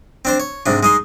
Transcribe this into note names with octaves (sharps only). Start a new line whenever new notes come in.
C4 D4 C5
C#5
G#2 C3 D4
G#3 D#4 C6